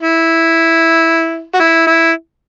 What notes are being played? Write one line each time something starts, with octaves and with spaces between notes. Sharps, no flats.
E4
F#4
E4
E4